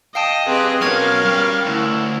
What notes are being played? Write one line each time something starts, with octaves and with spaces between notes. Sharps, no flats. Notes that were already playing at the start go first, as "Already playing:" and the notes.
D#5 F5 G5 A5
C4 G4 G#4 B4 D#5
F#3 B3 C#4 A#4 F5 C#6 F6 G#6
G3 G4
D2 E4